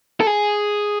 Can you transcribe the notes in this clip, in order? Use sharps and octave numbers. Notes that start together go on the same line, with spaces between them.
A4
G#4